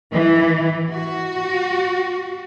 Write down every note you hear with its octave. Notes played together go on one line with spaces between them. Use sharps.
E3
F#4